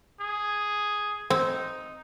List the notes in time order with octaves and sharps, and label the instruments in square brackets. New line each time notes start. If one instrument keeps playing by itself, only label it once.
[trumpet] G#4
[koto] C4 [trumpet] D#4